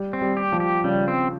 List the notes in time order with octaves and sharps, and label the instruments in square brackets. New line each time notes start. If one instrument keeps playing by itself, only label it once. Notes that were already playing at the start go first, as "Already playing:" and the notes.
Already playing: [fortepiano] G3
[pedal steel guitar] C4
[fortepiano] G3
[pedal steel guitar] G4
[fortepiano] F3
[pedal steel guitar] G4
[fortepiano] C#3 [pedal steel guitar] G3
[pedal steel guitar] C4